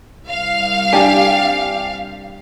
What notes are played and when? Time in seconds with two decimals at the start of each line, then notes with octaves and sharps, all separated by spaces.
0.25 C2 F5
0.92 D4 G4 G#5